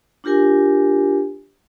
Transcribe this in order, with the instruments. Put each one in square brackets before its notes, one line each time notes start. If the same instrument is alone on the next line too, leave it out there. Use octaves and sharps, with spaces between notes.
[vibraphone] D4 F4 G4 A#4 G#5